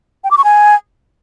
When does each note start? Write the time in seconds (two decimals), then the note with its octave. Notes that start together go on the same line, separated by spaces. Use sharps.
0.24 G5
0.31 D6
0.38 C#6
0.44 G#5